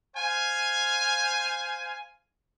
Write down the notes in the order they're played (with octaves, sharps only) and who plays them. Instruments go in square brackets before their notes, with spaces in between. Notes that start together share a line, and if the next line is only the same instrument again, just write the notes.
[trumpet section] C5 F5 G#5